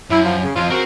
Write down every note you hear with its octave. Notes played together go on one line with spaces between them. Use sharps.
F#2 E4
F3
C#3
F2 F4
C#3 C4 F#4 A#4 C5